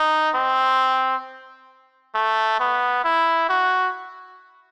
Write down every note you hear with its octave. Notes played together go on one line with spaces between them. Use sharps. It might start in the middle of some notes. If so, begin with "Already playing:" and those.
Already playing: D#4
C4
A3
B3
E4
F#4